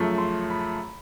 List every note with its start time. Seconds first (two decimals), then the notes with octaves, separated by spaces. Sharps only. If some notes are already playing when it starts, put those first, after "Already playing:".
Already playing: F#2 C#3 F3 A3
0.18 C6
0.50 B5